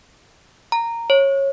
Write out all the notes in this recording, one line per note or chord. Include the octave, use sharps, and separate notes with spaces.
A#5
C#5